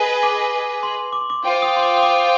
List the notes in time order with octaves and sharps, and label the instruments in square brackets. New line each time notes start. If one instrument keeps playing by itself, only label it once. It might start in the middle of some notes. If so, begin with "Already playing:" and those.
Already playing: [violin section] G#4 B4 D#5
[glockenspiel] D6
C6
D6
C6
D6
[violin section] F4 C5 G5 [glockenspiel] D6
[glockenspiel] D#6
C6
D6
D#6
D6